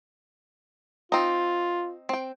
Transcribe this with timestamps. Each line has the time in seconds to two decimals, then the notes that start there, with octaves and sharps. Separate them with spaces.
1.12 C4 D#4 F4
2.09 C4 G5